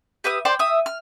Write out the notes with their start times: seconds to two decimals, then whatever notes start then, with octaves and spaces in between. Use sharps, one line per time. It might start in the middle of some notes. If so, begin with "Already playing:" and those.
0.24 G4 B4 E5 D#6
0.45 C5 D5 G5 C6
0.59 E5 D#6
0.86 F6